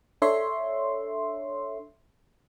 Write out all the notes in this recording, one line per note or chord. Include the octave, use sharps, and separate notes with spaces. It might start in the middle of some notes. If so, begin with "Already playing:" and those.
D4 A4 C#5 E5 C6